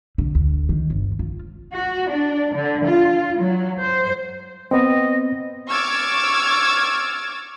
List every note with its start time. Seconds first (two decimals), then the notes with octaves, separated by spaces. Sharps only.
0.18 D3
0.35 D2
0.69 D#3
0.90 G1
1.19 F4
1.73 F#4
2.09 D4
2.54 D3
2.85 F4
3.42 F#3
3.82 C5
4.71 B3 C4 D#5
5.69 C#6 D6 E6 F6 G#6 A6